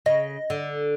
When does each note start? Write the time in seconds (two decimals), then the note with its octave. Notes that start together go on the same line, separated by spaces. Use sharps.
0.06 C#3 D#5
0.50 D3